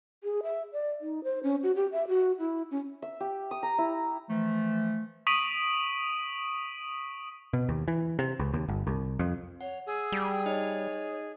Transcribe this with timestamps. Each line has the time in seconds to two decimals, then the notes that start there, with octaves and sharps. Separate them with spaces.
0.24 G#4
0.43 E5
0.73 D5
1.01 D#4
1.24 C5
1.43 C#4
1.63 F#4
1.76 G4
1.92 E5
2.08 F#4
2.39 E4
2.71 C#4
3.02 E5
3.20 G4
3.51 D#6
3.63 A#5
3.78 E4
4.29 E3 F3 A3
5.27 C#6 D#6 B6 D7 D#7 F#7
7.53 B2
7.69 D#2
7.88 E3
8.19 C3
8.39 C#2
8.54 D#2
8.69 G1
8.87 C2
9.19 F2
9.61 C#5 F#5
9.86 G#4 E6
10.12 G3
10.46 D#4 C#5 D#5